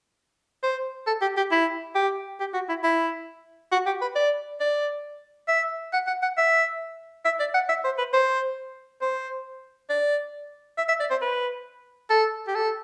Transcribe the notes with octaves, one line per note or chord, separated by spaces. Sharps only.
C5
A4
G4
G4
E4
G4
G4
F#4
E4
E4
F#4
G4
B4
D5
D5
E5
F#5
F#5
F#5
E5
E5
D5
F#5
E5
C5
B4
C5
C5
D5
E5
E5
D5
C5
B4
A4
G4
A4